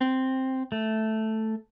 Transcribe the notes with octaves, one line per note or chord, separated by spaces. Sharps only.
C4
A3